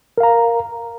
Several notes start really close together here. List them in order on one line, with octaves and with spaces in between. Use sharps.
A#4 F5 A#5